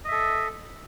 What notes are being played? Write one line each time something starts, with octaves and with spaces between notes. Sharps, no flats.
A4 D#5 E5